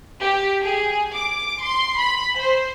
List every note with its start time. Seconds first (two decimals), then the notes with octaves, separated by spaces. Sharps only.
0.22 G4
0.64 G#4
1.14 D6
1.62 C6
2.00 B5
2.40 C5